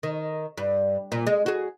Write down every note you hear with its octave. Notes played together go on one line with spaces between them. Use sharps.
D#3
G2
A#2
G#3
F#4 G#4